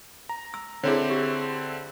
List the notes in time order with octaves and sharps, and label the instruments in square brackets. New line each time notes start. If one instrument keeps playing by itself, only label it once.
[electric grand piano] A#5
[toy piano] E6
[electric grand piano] D3 C4 E4 [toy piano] G#4 C#5
[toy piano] G4